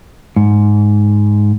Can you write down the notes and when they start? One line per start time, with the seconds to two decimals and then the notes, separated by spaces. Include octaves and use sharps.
0.36 G#2